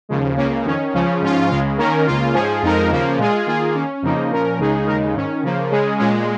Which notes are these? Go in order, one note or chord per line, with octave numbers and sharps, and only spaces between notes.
D#2 C#3 F3 G#3
C#2 C#3 A#3 C#4
F2 D#3 C#4
C#2 C#3 F3 C#4
G#2 F3 C#4 F4
C#2 C#3 G#3 F4
D#3 A#3 C#4 A#4
C#2 C#3 A#3 F4
G#2 F3 C#4 G#4
F2 F3 G#3 D#4 A#4
D#2 C#3 F3 A#3
A#2 G#3 F4 G#4
D#3 A#3 F4 G#4
D#3 A#3 C#4
F2 C#3 F3 A#3 D#4
A#2 F3 C#4 A#4
C#2 C#3 G#3 D#4 G#4
D#2 C#3 G#3 D#4 A#4
G#2 D#3 C#4
C#3 F3 A#3
C#3 G#3 C#4 G#4
A#2 G#3 C#4